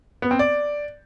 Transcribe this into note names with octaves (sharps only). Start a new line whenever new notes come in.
B3
C4
D5